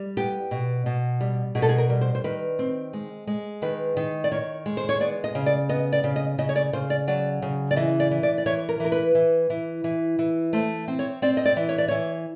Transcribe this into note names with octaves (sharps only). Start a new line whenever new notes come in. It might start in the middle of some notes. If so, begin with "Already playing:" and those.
Already playing: G3
B3 G4
B2
B2
G3
B2 G#4
A4
G#4
A#4
G3
C5
C5
D#3 B4
C4
G#3
G#3
D#3 B4
D#3
D5
D#3 C#5
G#3
C5
C#5
B3 D5
D#5
C#3
D5
B3 D#5
D5
C#3
D#5
C#3 D#5
C#5
D5
C#3 C5
D5
F#3 D5
C#3
D5
E3 D#5
D5
E3
D5
D5
E3 C#5
A#4
E3 A#4
B4
E3
E3
E3
E3
A3 C5
C4
C#5
C4 D5
D#5
D5
E3
C#5
D5
E3 C#5